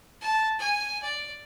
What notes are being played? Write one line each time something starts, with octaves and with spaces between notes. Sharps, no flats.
A5
G#5
D5